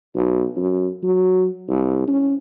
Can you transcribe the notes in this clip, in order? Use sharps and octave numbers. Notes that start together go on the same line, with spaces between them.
B1
F#2
F#3
C2
C#4